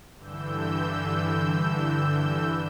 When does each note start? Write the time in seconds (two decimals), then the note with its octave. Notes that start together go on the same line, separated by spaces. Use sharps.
0.16 G2 D3 E3 E6 G6